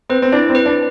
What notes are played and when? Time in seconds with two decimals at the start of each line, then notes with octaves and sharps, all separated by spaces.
0.10 C4 B4
0.22 C4
0.32 D4 E4
0.50 C4
0.55 B4
0.66 D4